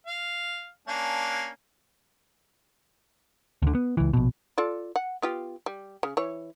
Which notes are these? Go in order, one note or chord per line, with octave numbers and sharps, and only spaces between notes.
F5
A#3 C#4 D4
D2 D3
B3
C#2 E3
A#1 B2
F4 A4 D5
F#5
B3 F4 G4
G3
C#3
E3 C#5